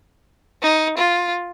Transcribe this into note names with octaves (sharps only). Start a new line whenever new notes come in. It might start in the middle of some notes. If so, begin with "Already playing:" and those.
D#4
F4